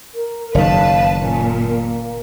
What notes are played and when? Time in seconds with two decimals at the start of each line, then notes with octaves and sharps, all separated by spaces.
0.14 A#4
0.55 F#1 D#3 B4 F5 A5
1.19 A#2 C#4
1.62 A#3